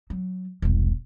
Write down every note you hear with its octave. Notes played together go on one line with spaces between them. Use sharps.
F#3
E1 C2